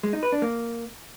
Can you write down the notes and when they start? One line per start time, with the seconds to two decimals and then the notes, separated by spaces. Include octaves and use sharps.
0.03 G#3
0.13 D#4
0.23 B4
0.32 D4
0.42 A#3